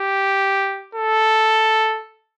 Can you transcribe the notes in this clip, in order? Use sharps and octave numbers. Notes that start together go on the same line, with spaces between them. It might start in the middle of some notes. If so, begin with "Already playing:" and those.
Already playing: G4
A4